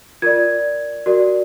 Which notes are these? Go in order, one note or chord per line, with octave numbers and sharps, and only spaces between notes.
F4 A#4 D5 G#6
F#4 A#4 D5